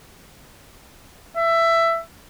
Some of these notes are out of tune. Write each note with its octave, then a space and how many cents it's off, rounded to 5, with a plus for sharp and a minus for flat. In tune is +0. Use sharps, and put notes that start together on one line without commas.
E5 +15